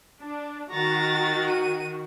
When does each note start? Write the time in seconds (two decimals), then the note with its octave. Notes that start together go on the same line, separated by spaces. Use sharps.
0.21 D4
0.71 D#3 F#4 A#5 A6
1.50 D#7